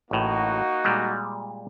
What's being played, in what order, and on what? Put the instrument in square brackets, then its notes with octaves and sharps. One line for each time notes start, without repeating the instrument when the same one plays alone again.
[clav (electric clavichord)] A1 A2 [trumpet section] A#3 D#4 F#4
[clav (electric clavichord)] A#2 G3 G#3